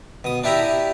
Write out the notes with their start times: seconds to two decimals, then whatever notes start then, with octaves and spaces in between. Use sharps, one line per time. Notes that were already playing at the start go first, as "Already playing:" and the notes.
0.24 B2 D#6
0.44 D4 E4 G4 E5 A#5 B5